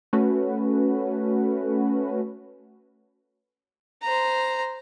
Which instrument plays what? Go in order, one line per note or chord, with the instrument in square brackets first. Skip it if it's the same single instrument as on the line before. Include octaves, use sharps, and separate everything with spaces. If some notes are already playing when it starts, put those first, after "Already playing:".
[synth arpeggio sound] A3 C#4 F#4 B4
[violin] C5 A#5